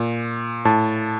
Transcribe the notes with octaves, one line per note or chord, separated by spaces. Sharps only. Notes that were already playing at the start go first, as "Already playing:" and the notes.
Already playing: A#2
A2 A5